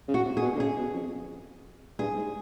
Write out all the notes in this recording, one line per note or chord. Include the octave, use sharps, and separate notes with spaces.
C#3
F#4
C3
G#4
B2
D3
C#3 G#4
B2
F2
G2 G#4
G#2